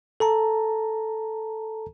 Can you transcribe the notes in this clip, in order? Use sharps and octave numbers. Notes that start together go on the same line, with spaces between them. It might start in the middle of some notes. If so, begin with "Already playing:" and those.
A4 A5 A#5